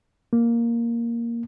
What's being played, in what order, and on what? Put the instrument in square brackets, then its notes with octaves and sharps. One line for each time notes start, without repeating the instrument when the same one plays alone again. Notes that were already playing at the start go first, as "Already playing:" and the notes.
[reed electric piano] A#3